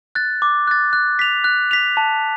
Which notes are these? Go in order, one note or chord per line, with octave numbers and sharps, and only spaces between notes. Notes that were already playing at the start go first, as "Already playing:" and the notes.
F#6 A6
D6
F#6 A6
F#6
B6 F7
F#6
B6 F7
A5